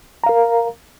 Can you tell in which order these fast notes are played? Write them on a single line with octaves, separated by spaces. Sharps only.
A#5 F5 A#4